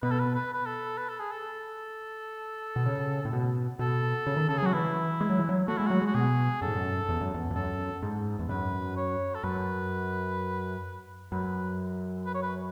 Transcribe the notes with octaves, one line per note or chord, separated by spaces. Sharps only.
B2 B4
A4
B4
B4
B4
A4
B4
A4
G#4
A4
B2
C#3
A2
B2
B2 A4
C#3
D#3
C#3 A4
G#4
F#3 F#4
E3 E4
G#3
F#3
E3
F#3
A3 F#4
G#3 E4
F#3 F#4
G#3
F#4
B2 G#4
F#2 A4
G#2
F#2
E2
F#2
E2
E2
F#2 A4
G#2
E2
F#2 B4
C#5
A4
F#2 B4
F#2 B4
B4
C#5
B4